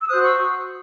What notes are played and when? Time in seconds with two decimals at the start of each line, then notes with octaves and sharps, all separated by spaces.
0.03 E6
0.09 F#4 C5 D#6 F#6
0.23 C#6 E6